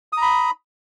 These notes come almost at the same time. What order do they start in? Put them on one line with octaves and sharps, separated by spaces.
D#6 A#5 B5